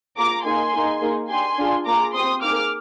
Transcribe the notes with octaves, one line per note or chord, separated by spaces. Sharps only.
A#3 F4 G#4 A#5 D6
A#3 D#4 G#4 G#5 C6
A#3 D#4 G#4
A#3 D#4 G#4
D4 G4 G#5 C6
D4 F4 G#4
A#3 F4 G#4 A#5 D6
C4 G4 C6 D#6
A#3 D#4 G#4 D6 F6